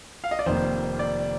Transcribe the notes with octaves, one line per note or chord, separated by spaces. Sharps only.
F5
D#5
D5
F1 F2 D#3 A#3 C5
D5